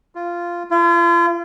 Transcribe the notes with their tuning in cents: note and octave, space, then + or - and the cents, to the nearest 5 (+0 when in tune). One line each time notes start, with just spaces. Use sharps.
F4 -10
F4 -40